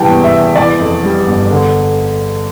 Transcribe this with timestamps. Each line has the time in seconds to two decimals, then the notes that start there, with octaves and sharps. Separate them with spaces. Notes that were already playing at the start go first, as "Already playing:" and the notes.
Already playing: E3 G3 G5 A5
0.09 E2
0.24 E5
0.32 E2
0.55 E3 D5
0.79 F2
1.03 G3
1.27 G1
1.51 D3